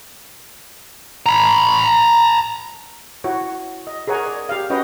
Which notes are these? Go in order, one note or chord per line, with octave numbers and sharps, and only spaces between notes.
A#5 B5
E4 F#4 C#5
D#5
G#4 A#4 C#5 F#5 G#5 A#5
D5
G4 F5
C#4 F#4 B4 C#5 D#5 G5